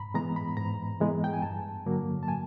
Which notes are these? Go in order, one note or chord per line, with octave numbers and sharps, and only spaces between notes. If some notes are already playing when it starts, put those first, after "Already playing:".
Already playing: G#2 A#5 B5
E3 G#3 B3 A#5
B5
G#2 A#5
E3 G#3 B3
G5
G#5
G2 A5
D3 F#3 A#3
A5
G#5